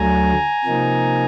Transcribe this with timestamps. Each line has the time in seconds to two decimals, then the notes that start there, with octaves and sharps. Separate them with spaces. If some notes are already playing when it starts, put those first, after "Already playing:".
Already playing: D2 D3 F#3 A3 G#5 A#5
0.65 C3 F3 A#3 D#4